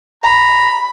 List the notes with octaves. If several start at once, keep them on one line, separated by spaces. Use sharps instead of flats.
A#5 B5